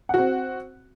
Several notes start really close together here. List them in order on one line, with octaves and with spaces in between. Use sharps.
F#5 F#4 C4